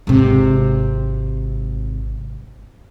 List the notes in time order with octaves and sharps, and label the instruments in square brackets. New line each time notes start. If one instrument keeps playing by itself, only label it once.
[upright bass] G#1 C3